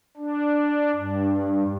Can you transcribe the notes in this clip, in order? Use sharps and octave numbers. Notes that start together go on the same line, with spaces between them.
D4
G2